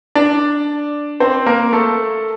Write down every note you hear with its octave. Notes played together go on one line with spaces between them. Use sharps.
D4 D5
C4 C5
A#3 A#4
A3 A4